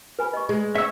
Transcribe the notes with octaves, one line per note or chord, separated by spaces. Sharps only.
B4 G#5 B5
D#5 C#6
G#3
C#4 E5 E6